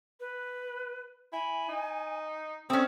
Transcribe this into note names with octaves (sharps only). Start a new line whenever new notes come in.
B4
E4 G#5
D#4
A3 C4 C#4 D#6